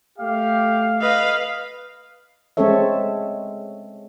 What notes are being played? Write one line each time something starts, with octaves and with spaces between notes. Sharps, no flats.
A3 G4 F5
B4 D#5 F5
G#3 C4 C#4 A4 C#5 E5